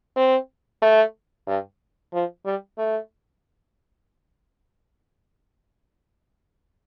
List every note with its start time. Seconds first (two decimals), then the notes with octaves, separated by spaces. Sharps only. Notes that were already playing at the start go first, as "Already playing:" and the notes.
0.16 C4
0.82 A3
1.47 G2
2.13 F3
2.45 G3
2.78 A3